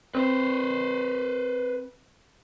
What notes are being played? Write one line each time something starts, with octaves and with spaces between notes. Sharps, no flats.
C4 B4 C5